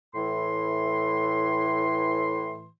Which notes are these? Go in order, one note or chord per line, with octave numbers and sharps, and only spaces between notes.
A2 E3 C6